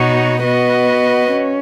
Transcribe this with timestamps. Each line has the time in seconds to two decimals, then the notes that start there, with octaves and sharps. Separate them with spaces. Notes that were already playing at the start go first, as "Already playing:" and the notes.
Already playing: B2 B3 D#4 F#4 C#5
0.41 B3 F#4 B4 D#5
1.31 C#4